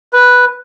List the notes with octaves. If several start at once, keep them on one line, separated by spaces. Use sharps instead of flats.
B4